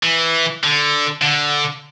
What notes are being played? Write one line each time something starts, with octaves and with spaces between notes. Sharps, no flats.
E3
D3
D3